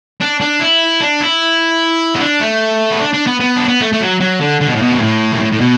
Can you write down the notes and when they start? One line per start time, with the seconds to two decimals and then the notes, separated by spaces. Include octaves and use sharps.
0.21 D4
0.41 D4
0.60 E4
1.01 D4
1.21 E4
2.15 B3
2.20 D4
2.40 A3
2.91 B3
3.01 D4
3.14 D4
3.27 B3
3.40 B3
3.56 D4
3.68 B3
3.81 A3
3.93 A3
4.00 F#3
4.20 F#3
4.40 D3
4.61 D3
4.67 B2
4.75 A2
4.82 B2
4.92 F#2
5.00 A2
5.32 F#2
5.39 A2
5.52 A2
5.60 B2